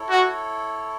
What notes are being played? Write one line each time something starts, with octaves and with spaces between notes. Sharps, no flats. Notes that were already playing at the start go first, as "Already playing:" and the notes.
Already playing: E4 A4 C#5
F#4